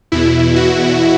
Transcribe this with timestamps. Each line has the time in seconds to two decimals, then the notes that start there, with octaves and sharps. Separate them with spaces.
0.12 E2 B2 E4
0.56 F#4